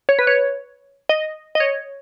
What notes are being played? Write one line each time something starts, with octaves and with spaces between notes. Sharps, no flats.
C#5
B4
C#5
D#5
D#5
C#5